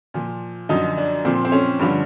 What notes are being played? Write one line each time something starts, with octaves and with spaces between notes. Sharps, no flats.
A#2 F3
F#2 D3 F3 D#4
D4
A#2 F3 C4
C4
C#4
G2 D3 F3